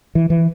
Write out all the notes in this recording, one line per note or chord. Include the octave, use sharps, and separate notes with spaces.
E3
E3